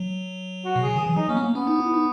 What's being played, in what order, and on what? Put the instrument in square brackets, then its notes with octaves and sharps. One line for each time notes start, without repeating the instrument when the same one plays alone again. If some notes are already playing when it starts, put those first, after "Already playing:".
Already playing: [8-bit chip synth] F#3
[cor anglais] F#4
[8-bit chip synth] B2
[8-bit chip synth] C#3 [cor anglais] G#4
[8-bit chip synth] D#3 [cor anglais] G#4
[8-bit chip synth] E3
[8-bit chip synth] F#3 [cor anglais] D#4
[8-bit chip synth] A#3 [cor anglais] C#4
[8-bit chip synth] B3
A#3
[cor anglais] B3 [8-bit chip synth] C#4
[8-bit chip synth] D#4
E4
D#4